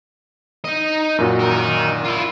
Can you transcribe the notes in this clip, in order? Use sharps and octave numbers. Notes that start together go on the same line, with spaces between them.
D#4 D#5
F#2 A#2 F#4
D#4 A#4
E4 F4